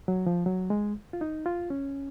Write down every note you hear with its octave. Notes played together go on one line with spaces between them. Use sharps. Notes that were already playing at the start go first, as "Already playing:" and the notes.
F#3
F3
F#3
G#3
F4
D#4
F4
C#4